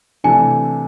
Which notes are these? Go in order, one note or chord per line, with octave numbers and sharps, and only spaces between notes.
C3 E3 A3 D4 G#5